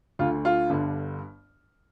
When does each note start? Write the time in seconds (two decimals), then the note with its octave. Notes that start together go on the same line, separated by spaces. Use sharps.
0.19 D2 D3 F4
0.45 F4
0.70 G1 G2 D3